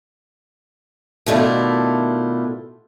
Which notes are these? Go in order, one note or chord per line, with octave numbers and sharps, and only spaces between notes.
B2 D#3 A3 D4 E4 F4